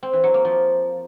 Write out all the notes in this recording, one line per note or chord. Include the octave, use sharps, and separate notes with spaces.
C4
E3
F#3
A#3
F3